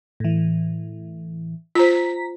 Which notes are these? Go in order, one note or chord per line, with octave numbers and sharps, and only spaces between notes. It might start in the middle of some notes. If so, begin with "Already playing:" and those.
A2 E3
F4 C5 A#5 B6